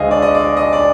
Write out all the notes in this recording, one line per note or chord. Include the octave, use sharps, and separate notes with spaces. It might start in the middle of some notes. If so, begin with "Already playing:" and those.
Already playing: D2 D3 G#3 D#5 F5 G#5
D5
D#5
D5
D#5
D5